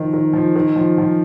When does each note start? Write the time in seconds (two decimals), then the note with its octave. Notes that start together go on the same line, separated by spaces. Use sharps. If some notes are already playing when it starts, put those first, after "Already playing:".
Already playing: D#3 F3
0.13 D#3
0.33 F3
0.56 D#3
0.76 F3
0.98 F3